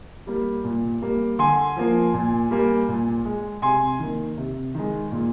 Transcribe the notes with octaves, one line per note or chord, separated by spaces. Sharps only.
G3 A#3
A#2
G3 A#3
D3 G#5 C6
F3 A#3
A#2
G3 A#3
A#2
G#3
C3 G#5 C6
D#3 A#3
C3
D#3 G#3
A#2